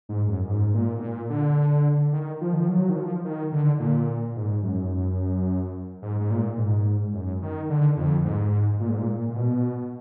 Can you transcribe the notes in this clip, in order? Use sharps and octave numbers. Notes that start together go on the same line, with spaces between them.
G#2
F#2
G#2
A#2
B2
A#2
D3
D#3
F3
D#3
F3
F#3
D#3
F3
D#3
D3
A#2
G#2
F#2
G#2
G#2
A#2
G#2
F#2
D#3
D3
F2
G#2
A#2
G#2
A#2
A#2
B2